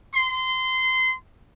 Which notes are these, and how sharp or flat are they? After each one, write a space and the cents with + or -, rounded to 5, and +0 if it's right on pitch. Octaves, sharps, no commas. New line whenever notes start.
C6 -20